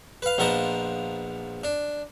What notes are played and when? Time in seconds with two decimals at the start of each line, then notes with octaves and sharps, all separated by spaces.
0.22 B4 F5
0.38 A#1 F3 B3 A#4 D#5 A5
1.64 D4